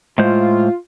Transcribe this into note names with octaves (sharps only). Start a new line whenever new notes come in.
A2 G#3 F4 C5